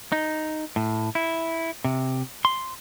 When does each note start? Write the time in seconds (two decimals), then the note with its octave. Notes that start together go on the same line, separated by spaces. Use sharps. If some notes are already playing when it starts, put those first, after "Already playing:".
0.12 D#4
0.76 A2
1.15 E4
1.84 C3
2.45 C6